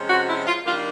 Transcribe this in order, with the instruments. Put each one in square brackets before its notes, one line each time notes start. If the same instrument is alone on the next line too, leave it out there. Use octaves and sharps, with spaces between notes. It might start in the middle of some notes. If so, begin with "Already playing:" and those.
Already playing: [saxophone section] C3 F3 G#3 C#4
F#4
E4
F4
D#3 G3 A#3 D4 F4